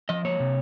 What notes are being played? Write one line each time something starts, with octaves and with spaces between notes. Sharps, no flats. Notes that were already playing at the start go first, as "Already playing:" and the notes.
F3 D#5
A#3 C#5
C3